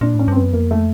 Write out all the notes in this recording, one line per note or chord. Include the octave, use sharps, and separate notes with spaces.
A#2 D4
A2 C#4
G2 C4
F#2 B3
F2 A#3
A3